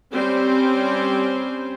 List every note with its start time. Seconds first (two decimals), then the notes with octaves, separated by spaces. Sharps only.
0.13 G3 C4 C#4 C5